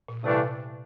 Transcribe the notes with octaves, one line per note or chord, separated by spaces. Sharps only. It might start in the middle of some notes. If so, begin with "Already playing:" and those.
A#2
G2 C3 E3 A3 D4